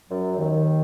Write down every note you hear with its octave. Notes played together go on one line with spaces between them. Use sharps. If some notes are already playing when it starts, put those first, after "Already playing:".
F#2 F#3
D#2 D#3